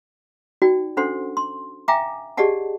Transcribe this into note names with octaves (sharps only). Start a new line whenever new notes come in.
D#4 F#4 D5 G5
C#4 D4 A4 C5 F#5 C6
C6
E5 F5 G5 G#5 A#5 D6
G4 G#4 D5 D#5 F#5 A5